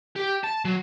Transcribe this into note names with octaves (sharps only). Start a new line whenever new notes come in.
G4
A5
F#3